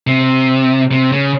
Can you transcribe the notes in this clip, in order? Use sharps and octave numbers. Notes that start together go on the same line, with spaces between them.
C3
C3
C#3